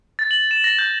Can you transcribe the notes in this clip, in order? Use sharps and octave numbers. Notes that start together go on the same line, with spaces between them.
A6
F#7
E7
A#6
G6